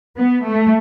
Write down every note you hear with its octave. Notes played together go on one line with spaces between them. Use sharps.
B3
A3